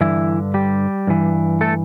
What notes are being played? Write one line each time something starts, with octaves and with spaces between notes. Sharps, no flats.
G2 D3 E3 E4
G3 G4
G2 E3
A3 A4